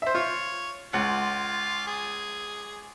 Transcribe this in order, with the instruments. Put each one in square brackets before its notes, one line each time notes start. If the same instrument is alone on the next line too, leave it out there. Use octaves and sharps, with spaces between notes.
[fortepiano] C5 E5
[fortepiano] F4 [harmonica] C#5
[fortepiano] C#2 F#5 [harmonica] F4
[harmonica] G#4